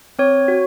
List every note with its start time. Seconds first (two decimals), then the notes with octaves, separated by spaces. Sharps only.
0.19 C4 C#5
0.48 F#4